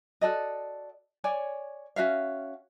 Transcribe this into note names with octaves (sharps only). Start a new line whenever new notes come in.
F#4 A4 D5 D#5
C#5 D5 G#5
C#4 F#4 E5 F5